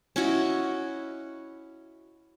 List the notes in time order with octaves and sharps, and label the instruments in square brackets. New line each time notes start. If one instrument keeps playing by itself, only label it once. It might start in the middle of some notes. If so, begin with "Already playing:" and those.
[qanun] C#4 E4 F#4 D#5